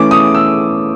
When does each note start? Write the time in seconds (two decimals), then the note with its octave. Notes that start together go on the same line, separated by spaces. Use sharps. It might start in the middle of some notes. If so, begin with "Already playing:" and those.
Already playing: E3 A3 C#4 D6
0.11 D#6
0.34 E6